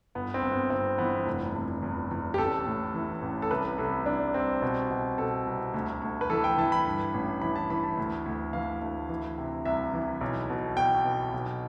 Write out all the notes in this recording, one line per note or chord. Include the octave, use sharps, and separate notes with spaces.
G1 B3
C4
G1
B3
G1 C4
E3 B3
F1
F1
E2
E2
G4
A1 A4
A2
E3
A1
A4
C2 B4
C2 A4
C2 D4
C2 C4
B2
B2
B2 A4
C2
D2
D2
B4
E3 A4
G5
E3 A5
B5
G2
A1
E3 B5
A5
E3 B5
A5
D2
D2
E3 F5
D2
E3
C3
C2 E5
E3
B1
B2
B2 G5
B2
B1